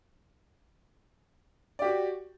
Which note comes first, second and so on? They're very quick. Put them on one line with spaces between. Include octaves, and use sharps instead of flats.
D5 G4 F#4